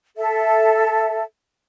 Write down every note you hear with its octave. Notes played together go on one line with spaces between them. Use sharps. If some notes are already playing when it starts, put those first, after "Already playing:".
A4 E5